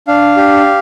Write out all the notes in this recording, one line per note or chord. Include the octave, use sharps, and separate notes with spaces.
D4 F5
G4